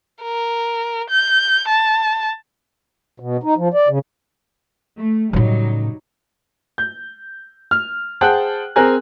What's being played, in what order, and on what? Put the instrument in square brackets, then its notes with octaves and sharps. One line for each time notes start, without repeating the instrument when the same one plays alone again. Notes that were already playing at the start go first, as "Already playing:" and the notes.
[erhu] A#4
G6
A5
[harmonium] B2
D#4
F3
D5
C#3
[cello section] A3
[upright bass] A2 C#3 [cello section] F#3 G3 D#4
[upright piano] G6
F6
G#4 C5 F#5 G5 A5 F#6
C4 G#4 A#4 G#5 A#5 F#6